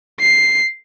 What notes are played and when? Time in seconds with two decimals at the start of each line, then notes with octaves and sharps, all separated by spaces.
0.20 C7